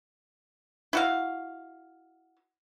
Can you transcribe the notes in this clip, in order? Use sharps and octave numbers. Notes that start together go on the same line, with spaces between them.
E4 F#4 F5